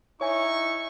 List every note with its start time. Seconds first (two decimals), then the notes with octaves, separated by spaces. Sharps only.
0.21 D#4 E4 C#5 G#5 C#6